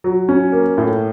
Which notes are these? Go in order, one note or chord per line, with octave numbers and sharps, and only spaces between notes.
F#3
C#4
A#3
A2